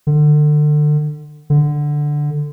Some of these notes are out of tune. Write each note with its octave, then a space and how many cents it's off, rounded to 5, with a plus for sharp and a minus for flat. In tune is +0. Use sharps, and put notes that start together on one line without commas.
D3 +30
D3 +5